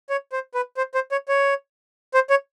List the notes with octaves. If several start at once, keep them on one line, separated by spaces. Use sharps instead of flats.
C#5
C5
B4
C5
C5
C#5
C#5
C5
C#5